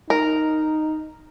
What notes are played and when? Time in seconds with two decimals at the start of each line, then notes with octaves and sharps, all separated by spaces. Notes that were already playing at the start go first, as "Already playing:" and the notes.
0.10 D#4 A#4